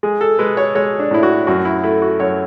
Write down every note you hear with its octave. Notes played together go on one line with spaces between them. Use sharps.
G#3 G#4
A4
G#3 B4
C#5
G#3 C#5
D4
A2 E4
F#4
F#2 F#4
E4
A3 E4
F#4
F#2 C#5